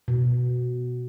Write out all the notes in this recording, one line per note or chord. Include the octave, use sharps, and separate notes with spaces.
B2